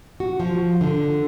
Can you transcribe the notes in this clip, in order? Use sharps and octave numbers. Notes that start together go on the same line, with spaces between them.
F#4
F3
D3